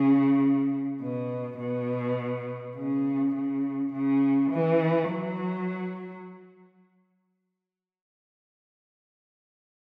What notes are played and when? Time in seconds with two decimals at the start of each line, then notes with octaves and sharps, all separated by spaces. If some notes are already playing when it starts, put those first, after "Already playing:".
Already playing: C#3
1.02 B2
1.59 B2
2.77 C#3
3.35 C#3
3.93 C#3
4.52 E3
5.11 F#3